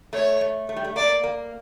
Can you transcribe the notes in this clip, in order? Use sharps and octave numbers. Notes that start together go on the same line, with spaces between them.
A3 C#5
A3
A3
G3
A3
A#3 D5
A#3